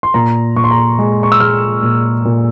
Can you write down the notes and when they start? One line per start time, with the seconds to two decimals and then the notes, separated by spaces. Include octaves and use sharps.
0.03 C6
0.14 A#2 A#5
0.56 A#2 C#6
0.64 C6
0.71 A#5
0.78 C6
0.99 G#3
1.23 C#6
1.32 E6
1.40 G#3 F6
1.83 A#2
2.25 A#2